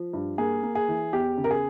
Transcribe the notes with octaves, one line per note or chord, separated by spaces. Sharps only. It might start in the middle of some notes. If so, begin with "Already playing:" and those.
Already playing: F3
G2
A#3 G#4
A#3
G#4
E3
E2 G4
C#3
A#4
G#4